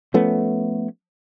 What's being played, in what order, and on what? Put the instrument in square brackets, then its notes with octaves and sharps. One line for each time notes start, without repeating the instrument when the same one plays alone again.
[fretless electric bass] F3 A3 B3 C#4